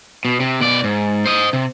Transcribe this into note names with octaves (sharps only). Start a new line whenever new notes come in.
B2
C3
B2 D5
G#2
C5 D#5
C3